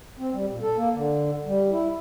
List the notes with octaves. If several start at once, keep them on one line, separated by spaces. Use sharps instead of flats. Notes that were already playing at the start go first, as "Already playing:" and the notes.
C4
G3
A#2
A4
A#3
D3
G3
E4